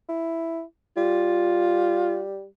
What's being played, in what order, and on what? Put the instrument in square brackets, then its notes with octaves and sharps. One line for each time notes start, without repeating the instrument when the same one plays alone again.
[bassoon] E4
[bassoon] G3 [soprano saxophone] F4